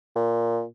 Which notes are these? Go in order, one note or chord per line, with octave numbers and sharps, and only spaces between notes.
A#2